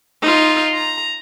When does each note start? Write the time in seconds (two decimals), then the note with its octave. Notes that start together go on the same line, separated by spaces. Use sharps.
0.22 D#4 F4
0.74 A#5